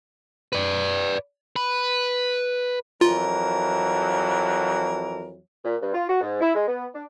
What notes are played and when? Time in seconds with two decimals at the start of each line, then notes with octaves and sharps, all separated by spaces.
0.53 B4 D5
1.56 B4
3.01 F2 E3 F#3 F4 A#4
5.64 A#2
5.81 G2
5.93 F4
6.08 F#4
6.21 G#2
6.40 E4
6.54 G#3
6.67 B3
6.93 D4